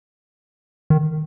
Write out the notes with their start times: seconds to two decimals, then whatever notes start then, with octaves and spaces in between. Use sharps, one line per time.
0.90 D#3